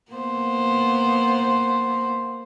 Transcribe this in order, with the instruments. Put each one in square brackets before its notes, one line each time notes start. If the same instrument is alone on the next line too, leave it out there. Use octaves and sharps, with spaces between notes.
[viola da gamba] A#3 B3 C5